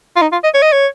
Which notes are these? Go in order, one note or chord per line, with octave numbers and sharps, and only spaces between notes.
F4
D#4
F4
D#5
C#5
D#5
C#5